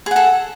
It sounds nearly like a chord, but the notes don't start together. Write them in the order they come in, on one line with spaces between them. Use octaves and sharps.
G#4 F#5 A4